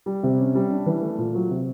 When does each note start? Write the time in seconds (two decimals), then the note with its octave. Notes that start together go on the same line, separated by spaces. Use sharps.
0.06 G3
0.23 C3
0.38 C#4
0.55 G3
0.71 D4
0.86 E3
1.02 A3
1.18 A#2
1.35 F#3
1.50 C3